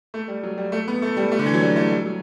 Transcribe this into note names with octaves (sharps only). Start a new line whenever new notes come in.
A3
G3
F#3
G3
A3
B3
A3
G3
A3
D3
E3
F#3
G3
A3
G3
F#3